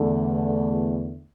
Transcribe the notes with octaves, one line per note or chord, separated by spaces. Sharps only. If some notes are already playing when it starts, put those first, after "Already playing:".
Already playing: E2 D3 A3